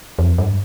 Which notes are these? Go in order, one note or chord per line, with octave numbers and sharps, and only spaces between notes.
F2
G2